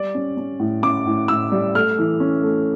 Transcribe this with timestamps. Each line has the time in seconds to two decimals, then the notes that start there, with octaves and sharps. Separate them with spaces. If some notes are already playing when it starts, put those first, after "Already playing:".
Already playing: G3 D5
0.15 C#4
0.37 C#4
0.60 A2
0.82 C#4 D6
1.06 A2
1.28 A2 E6
1.52 G3
1.75 A3 F6
1.98 E3
2.20 C#4
2.43 A3